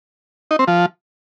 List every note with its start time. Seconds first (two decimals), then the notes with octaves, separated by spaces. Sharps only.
0.51 D#4
0.59 C4
0.68 F3